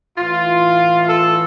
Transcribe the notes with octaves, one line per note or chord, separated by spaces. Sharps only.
A2 E3 F4
A4